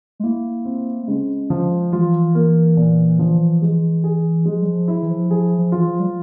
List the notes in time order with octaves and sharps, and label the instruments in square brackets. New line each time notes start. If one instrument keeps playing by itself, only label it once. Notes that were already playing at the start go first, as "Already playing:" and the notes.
[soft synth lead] G#3
[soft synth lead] A#3 [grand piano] E4
[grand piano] C4
[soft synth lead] A#3
[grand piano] C#3 [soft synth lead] G#3
[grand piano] F3
[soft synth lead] E3 [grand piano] F4
[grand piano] A#3
A#2
F3
G#3
G#4
[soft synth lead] F3 [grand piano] G#3
[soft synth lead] G3
F3
[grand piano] E4
[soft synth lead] E3
F3
[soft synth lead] F3 [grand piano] G#4
[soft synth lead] F3
[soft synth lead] E3 [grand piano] F4
[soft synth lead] F3
G3
F3